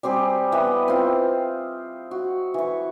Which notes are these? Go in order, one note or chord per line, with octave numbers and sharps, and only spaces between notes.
G3 C4 G4 G#4
E3 B3 B4 D#5
C4 F4
F#4
E3 C#6